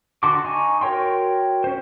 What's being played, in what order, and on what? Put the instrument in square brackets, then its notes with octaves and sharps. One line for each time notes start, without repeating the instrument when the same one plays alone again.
[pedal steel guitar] D3 F#4 A5 C6 D6
D#4 G#5 C#6
F#4 A#4 C#5 G5 C6
C#4 C5